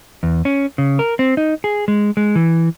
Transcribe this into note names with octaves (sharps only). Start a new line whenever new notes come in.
E2
C#4
C#3
A#4
C4
D#4
G#4
G#3
G#3
E3